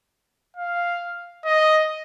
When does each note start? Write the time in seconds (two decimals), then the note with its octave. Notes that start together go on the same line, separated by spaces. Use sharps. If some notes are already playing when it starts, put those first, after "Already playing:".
0.56 F5
1.45 D#5